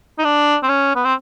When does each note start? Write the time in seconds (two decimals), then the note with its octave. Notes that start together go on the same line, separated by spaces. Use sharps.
0.19 D#4
0.24 D4
0.63 C4
0.69 C#4
0.96 B3
1.05 C4